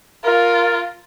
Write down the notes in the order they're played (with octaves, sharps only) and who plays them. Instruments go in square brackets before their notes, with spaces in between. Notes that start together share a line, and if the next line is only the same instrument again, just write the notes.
[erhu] F4 [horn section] A#4